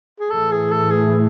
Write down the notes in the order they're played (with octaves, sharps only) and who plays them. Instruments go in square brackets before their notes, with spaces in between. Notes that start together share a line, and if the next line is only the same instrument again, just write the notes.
[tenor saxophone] G#4
[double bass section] A2 E3 A3 [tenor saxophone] A4
[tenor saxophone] G#4
A4
G#4